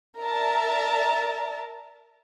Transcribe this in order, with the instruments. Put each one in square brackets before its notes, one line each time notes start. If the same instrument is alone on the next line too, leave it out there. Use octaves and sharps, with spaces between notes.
[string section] A#4 D5 E5 A5 A#5